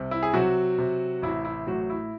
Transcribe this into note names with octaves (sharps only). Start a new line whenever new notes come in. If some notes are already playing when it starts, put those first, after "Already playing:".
Already playing: C2 C3
E4
G#4
C3 F#3 F#4
C3
A1 E4
E4
A2 F#3 F#4
E4